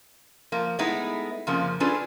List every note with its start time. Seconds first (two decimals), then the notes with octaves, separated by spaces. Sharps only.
0.52 F3 A#3
0.79 G#3 A3 B3 D#4 E4
1.47 F2 C#3 F3 A#3
1.80 C#4 D4 F4 G#4 A4 B4